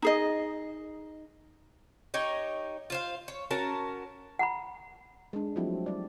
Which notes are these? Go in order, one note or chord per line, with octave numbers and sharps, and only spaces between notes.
D#4 G#4 D#5
D#4 G4 C#5 D#5
F4 C5 F5
C#5
C#4 F#4 A#4 A5
F#5 A#5 B5
G#3 D4
F3 F#3 A3 C4 E4 F#4
G3 D5